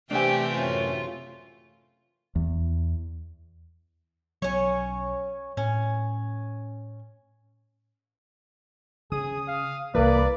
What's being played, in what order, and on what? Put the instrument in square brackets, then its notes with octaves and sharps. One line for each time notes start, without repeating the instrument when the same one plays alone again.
[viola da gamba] C3 E3 A3 [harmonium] C4 [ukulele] D4 G#5 [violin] G4 G5
[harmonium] F#2 A2 C#4 [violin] F4
[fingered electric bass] E2
[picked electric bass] B1 F#3 [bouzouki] C#4 C#5
[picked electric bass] A2 [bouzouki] C#4
[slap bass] C#3 [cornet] G#4 [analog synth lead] D#6
[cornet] F5
[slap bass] C2 E3 [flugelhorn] A#3 [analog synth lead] B4 [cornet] D5